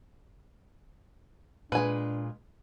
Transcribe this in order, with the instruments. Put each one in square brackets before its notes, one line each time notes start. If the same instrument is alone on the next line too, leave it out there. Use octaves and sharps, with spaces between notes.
[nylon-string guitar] A#2 G#3 [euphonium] D4 [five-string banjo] B4 G#5